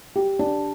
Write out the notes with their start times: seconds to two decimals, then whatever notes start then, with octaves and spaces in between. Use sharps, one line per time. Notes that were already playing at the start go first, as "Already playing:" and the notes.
0.16 G4
0.39 D4